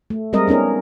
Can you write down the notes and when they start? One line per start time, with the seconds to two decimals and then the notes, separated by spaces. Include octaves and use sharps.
0.10 A3
0.33 G3 G#3 C4 A#4 D#5
0.48 B3 C#4 D#4 A#4